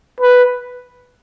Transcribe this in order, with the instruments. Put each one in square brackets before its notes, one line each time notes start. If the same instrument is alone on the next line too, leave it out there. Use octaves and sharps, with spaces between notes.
[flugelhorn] B4